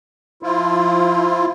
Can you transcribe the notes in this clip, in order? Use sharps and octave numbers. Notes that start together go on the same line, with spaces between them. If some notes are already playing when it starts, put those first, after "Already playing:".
F3 E4 F4